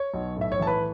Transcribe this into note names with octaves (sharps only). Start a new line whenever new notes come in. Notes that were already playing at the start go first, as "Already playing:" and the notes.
Already playing: C#5
B1
A2
E5
C#5
E3 A5
B4 B5